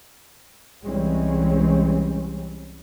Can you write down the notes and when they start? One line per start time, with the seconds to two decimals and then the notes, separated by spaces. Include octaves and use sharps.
0.84 C2 E3 G3 G#3 C4 C#4